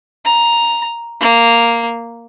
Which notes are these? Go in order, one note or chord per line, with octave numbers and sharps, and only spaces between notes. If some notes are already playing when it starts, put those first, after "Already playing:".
A#5
A#3